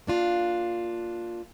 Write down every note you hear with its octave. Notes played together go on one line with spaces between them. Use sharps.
A#3 D4 F4